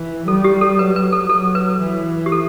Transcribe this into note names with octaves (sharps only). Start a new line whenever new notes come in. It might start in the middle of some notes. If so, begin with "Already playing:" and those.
Already playing: E3
G3 A4
G4
A4
F#3 B4
B4
A4
F#3 A4
B4
E3
G4
A4